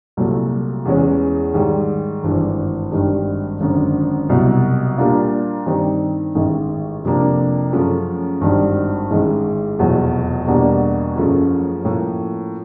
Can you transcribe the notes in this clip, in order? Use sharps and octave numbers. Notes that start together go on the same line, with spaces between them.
C2 A#2 F#3 A3
E2 C#3 E3 G#3 C#4
G#2 D#3 G3
G#1 G2 E3
G#1 G2 D#3 G3
G#1 F#2 D3
C2 B2 F#3
A#2 G3 A#3 D4 F4
G2 D#3 G3 C4 D#4
A1 G#2 D#3
F2 C3 F3 A#3 D4
F#2 C#3 F3 A3
G#1 G2 D#3 G3
A1 G#2 D#3 G#3
F1 E2 B2 F#3
E2 B2 G3 A#3 D4
F#1 F#2 C#3 F3 A3
A2 F3 A#3 C#4